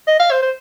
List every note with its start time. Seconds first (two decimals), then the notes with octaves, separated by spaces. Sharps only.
0.07 D#5
0.19 F5
0.31 C5
0.42 C5